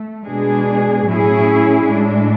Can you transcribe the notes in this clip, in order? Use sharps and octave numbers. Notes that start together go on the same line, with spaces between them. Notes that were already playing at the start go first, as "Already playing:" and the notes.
Already playing: A3
B2 G#3 D4 G#4
A2 F#3 C#4 E4 G#4
A2 G#3 D4